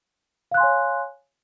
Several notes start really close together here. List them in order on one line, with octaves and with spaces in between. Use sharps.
F5 F#6 C6 G#5 C#5